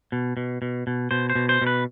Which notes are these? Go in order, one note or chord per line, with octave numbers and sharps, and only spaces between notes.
B2
B2
B2
B2
B2 C5
C5
B2
C5
B2
B4